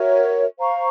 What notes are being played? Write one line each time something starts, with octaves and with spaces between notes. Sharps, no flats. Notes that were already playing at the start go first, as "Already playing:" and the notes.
Already playing: F#4 A#4 C#5 E5
C5 F5 A#5 C#6